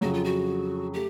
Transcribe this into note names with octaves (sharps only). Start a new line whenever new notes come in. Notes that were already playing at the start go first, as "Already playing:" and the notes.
F2 C#3 F#3 F#4
F4
F#4
A3 G4